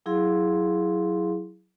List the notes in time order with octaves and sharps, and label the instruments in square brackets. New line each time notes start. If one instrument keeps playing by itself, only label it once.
[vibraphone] F#3 E4 G#4 F5 C6